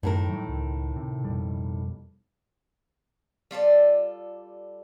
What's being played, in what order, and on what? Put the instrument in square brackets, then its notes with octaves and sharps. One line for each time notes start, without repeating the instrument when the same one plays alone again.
[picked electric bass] F#2 [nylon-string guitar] A2 D#3 A#4
[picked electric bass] E3 F#3 G3
C#2
C3
F2 B2 G3
[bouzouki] G3 F4 A4 D5